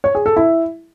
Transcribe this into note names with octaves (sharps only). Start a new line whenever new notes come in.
C#5
G#4
A4
E4